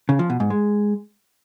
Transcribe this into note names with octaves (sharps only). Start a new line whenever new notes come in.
C#3
F3
B2
G#2
G#3